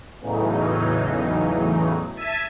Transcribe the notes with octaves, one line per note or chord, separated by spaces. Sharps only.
E2 A2 C#3 E3 F#3 D#4
E5 A5 G#6 B6 D#7